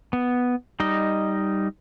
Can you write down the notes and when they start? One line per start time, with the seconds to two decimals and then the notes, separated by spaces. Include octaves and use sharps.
0.13 B3
0.80 G3 D#4 D#5